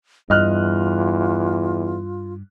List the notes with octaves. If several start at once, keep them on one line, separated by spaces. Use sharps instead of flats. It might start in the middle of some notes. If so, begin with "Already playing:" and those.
E2 G2 F4 D#5 F6 F#6